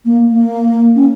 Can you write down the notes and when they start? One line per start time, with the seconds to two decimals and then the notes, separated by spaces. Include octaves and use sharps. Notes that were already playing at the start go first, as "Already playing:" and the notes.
0.05 A#3
0.29 A#3
0.96 C#4